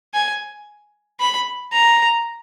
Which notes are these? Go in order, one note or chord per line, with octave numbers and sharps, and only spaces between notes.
G#5
B5
A#5